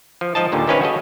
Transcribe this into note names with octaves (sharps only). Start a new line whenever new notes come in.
F3
G#2 F3 D#5 A5
D#2 A#2 D3 G3
D#3 C4 C#4 E4 B4 F5
F#4 G#4 A4 D#5